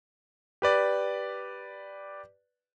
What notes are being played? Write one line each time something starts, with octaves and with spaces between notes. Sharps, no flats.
G4 B4 D5